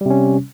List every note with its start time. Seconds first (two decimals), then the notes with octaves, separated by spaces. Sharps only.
0.01 G3
0.06 C3
0.10 C#4